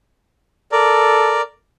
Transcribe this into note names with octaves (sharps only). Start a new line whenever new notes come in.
A4 A#4 D5